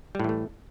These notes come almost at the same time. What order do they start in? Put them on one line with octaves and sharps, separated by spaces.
G3 A2 E3 A3